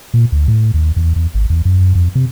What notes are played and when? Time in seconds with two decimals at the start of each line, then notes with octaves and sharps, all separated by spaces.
0.14 A#2
0.32 D2
0.48 A2
0.74 D#2
0.96 E2
1.16 E2
1.35 G#1
1.50 E2
1.65 F#2
1.95 F2
2.15 C3